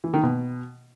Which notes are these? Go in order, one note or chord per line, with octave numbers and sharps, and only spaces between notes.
E3
D#3
B2